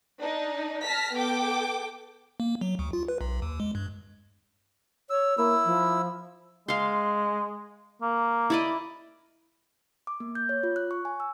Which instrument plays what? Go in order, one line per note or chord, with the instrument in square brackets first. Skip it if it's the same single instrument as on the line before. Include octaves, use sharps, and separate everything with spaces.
[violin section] D4 D#4
A5 F6 A#6 B6
B3 A4 G5 D6
[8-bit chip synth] A#3
F#3
D2
F4
B4
B1
D#2
G#3
G2
[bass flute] C#5 [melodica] E6
[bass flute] A#3 [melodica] E4 E6
[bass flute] F3
[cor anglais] G#3 [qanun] F5 C6
[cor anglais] A#3
[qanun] E4 D5 D#5
[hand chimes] D6
A#3
G6
C#5
F4
F#6
C#6
G#5
E6